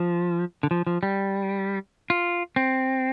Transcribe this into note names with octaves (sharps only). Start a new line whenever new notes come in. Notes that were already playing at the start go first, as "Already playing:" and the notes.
Already playing: F3
D3
F3
F3
G3
F4
C4